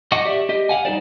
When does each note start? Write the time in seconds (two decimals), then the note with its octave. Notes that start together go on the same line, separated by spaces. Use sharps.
0.12 D#5 F#5 C#6 D6
0.25 G4 D5 E5
0.49 G4 D#5
0.69 F5 F#5 G#5
0.85 G3 D#4 G4 C5 D5